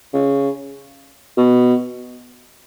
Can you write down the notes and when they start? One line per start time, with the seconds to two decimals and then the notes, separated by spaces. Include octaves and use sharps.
0.14 C#3
1.38 B2